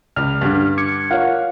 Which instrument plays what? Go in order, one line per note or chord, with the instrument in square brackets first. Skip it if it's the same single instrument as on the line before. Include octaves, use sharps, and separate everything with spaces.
[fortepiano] C#2 [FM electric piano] F6
[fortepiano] G2 D3
[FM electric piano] D6 G#6 C#7
[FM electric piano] F4 F5 F#5 [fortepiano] A#4 C#5